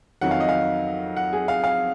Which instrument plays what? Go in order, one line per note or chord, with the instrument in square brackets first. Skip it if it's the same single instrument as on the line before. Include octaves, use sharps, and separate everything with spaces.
[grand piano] F2 D#3 F#3 F#5
F5
D#5
F5
F#5
G#4
F5
F5